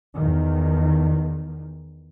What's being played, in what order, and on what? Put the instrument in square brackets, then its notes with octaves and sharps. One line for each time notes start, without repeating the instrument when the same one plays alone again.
[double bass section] E2 D#3